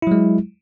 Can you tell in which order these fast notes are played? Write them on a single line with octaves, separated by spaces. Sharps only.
E4 F#3 G#3